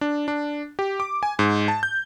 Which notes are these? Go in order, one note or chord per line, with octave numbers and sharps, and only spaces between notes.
D4
D4
G4
D6
G#5
G#2
A5
G6